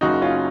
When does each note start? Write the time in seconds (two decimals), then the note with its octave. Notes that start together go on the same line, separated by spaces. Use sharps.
0.01 F#1 F#2 C#3 D#4 F#4
0.22 C#4 F4